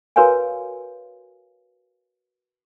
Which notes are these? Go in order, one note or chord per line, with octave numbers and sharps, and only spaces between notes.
F#4 A#4 B4 C#5 F5 G#5